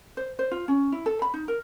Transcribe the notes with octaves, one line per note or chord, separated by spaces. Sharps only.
C5
C5
F4
C#4
E4
A4
B5
D#4
A#4